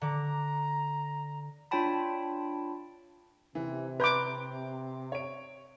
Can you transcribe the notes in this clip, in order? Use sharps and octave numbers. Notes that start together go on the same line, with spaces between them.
D3 A#5 D6
D4 F4 C#5 G5 A5 B5
C3 E3
B4 A#5 C6 D6 G6
C#5 D7